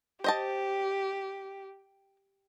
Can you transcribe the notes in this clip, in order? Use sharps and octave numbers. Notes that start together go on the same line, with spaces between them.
G4 C5 D#5 A5